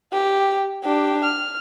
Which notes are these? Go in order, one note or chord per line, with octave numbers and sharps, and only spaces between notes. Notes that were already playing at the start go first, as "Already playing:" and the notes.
G4
D4 G4
F6